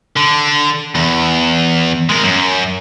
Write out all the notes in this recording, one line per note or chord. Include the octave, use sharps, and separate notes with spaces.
D3
E2
G#3 A#4
F#2